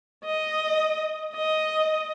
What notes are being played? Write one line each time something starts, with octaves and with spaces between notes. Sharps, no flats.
D#5
D#5